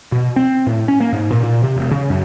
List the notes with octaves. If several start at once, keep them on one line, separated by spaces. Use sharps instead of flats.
B2
C4
A2
C#4
A#3
G#2
A#2
A#2
C3
E1
C#3
F#2